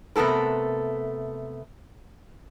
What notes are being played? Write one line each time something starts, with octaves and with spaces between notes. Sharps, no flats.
C3 A3 B3 A4 A#4